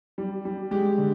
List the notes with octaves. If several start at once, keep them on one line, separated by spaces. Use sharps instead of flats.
G3
G3
G#3 G4
D3